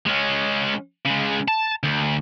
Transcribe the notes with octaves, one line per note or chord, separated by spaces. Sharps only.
G#3 C#4
C#3 G#3
A5
D2